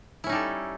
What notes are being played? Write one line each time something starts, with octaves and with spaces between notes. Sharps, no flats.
G3 C#4 D#4 E4 A4